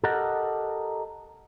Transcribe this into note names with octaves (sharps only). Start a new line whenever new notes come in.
G4 A4 A#4 D#5 F#5